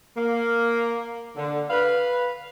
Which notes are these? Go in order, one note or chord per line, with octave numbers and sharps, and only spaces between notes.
A#3
D3
B4 F5